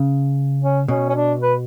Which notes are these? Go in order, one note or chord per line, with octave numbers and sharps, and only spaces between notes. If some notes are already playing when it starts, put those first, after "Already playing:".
Already playing: C#3
C#4
B2 C#4
C#4
D4
B4